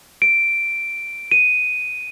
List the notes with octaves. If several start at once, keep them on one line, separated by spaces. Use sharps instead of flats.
D7
D#7